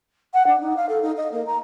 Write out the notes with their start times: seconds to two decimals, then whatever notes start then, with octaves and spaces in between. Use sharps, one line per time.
0.34 F#5
0.47 D4
0.61 D#4
0.77 F5
0.89 A4
1.02 D#4
1.17 D#5
1.32 A#3
1.46 A#5